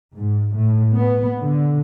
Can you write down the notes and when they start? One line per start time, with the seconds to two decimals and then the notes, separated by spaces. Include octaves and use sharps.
0.16 G#2
0.57 A2
0.95 B3
1.40 D3